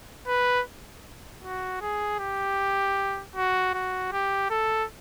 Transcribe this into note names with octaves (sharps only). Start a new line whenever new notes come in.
B4
F#4
G#4
G4
F#4
F#4
G4
A4